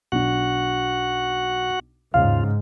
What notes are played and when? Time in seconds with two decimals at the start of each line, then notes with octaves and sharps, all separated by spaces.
0.12 B1 D4 F#4 F#5
2.14 D#2 G#2 C#3 F4 F5